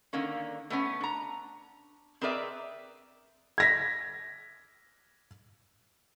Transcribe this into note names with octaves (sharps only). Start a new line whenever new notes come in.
D3 D#3 A#3 C#4
A3 B3 C#4
D4 A#5
C4 G#4 A#4 B4 D5 E5
G#6 A#6 B6